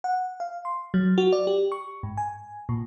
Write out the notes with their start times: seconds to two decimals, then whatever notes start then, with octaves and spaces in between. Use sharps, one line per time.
0.04 F#5
0.40 F5
0.65 C6
0.94 F#3
1.18 F#4
1.32 D5
1.47 G4
1.72 C#6
2.03 G#2
2.17 G#5
2.69 A#2